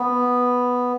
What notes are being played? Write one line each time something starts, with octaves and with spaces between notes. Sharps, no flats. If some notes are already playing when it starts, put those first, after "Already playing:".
Already playing: B3